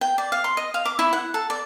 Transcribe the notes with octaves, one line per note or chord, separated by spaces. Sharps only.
G5
D5
F5
C6
D#5
F5
D6
E4
F#5
A4
D5